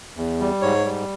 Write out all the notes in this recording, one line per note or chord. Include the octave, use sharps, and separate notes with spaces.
E2
G3
G#2 C#5
G3